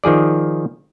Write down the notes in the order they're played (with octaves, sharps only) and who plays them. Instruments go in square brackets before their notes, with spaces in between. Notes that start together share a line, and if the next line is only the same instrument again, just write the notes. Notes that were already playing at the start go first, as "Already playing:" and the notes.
[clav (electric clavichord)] D#3 F3 G#4 D5